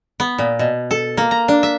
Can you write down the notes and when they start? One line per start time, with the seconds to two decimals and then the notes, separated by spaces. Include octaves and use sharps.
0.20 B3
0.38 A#2
0.59 B2
0.91 A4
1.17 A#3
1.31 A#5
1.48 D4
1.63 E5